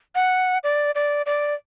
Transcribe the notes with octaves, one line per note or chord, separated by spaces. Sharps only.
F#5
D5
D5
D5